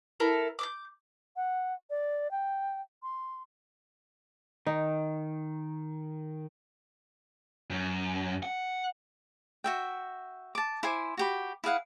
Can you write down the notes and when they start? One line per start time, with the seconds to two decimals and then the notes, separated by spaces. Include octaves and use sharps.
0.20 E4 A4 A#4
0.59 D6 D#6 G6
1.36 F#5
1.90 D5
2.31 G5
3.03 C6
4.66 D#3 D#4
7.70 F#2
8.43 F#5
9.64 F#4 E5 G5
10.55 A5 D6
10.83 E4 C5 G#5 D6
11.17 F#4 G4 B5
11.64 E4 G#4 F5 F#5